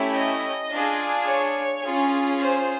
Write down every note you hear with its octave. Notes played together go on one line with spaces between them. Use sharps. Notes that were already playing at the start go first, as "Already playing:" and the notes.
Already playing: A3 C#4 E4 G4
D#5
D4 F4 G#4
C#5
C#4 F4 G#4
C5